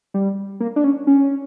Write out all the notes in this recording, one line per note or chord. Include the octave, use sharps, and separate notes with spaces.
G3
A#3
D4
C#4
C#4